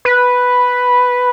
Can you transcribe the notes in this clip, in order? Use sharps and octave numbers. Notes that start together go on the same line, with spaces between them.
B4